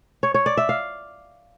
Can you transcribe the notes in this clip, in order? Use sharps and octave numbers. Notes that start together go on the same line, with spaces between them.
C#5
C#5
D5
E5
F5